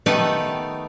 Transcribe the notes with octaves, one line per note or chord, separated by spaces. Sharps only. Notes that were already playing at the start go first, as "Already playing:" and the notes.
D#3 A3 B3 D#4 G4 B4